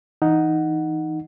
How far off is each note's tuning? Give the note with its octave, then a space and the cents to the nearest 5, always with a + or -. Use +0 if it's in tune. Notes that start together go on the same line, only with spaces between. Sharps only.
E3 +0 D#4 +0 F#5 +0